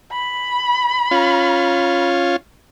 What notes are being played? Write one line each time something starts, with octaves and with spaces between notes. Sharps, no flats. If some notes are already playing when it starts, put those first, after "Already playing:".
B5
C#4 F4